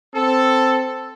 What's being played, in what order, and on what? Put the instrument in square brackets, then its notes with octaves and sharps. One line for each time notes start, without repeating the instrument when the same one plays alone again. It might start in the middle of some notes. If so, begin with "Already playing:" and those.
[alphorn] C4 [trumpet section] A4